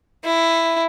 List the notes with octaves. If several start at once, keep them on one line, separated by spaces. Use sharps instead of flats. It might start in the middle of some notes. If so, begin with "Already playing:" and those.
E4